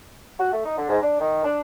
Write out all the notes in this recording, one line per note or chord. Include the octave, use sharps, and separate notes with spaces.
F#4
A3
D#4
D3
G#2
D4
D#3
D4